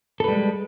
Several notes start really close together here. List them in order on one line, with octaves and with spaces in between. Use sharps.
A4 B4 G3 G#3